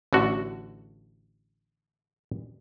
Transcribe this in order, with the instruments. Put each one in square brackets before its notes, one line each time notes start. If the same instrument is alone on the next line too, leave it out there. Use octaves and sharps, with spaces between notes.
[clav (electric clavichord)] A1 D3 F#4